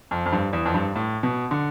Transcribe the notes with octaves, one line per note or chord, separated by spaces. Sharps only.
F2
F2
G2
E2
F2
G2
A2
B2
D3